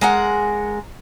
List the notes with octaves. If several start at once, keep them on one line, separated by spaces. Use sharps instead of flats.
G#3 A#4 F#5